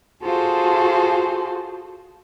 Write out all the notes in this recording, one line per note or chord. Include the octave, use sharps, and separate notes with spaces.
F4 F#4 G#4 A4 C5